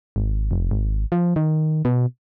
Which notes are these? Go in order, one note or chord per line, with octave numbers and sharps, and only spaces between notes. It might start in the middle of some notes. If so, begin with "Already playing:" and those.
G#1
F1
G#1
F3
D#3
B2